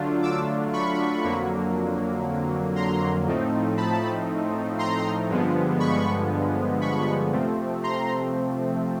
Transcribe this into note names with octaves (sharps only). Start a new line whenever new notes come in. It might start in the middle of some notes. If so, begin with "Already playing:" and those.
Already playing: D3 F#3 A3 D4 F4
D6 E6
B5 C#6
F2 D3 F#3 A#3
A#5 C6
A2 F3 A3 C4 D#4
A5 B5
A#5 C6
G2 D3 F3 G#3 B3
B5 C#6
B5 C#6
C3 F3 A3 C4
A#5 C6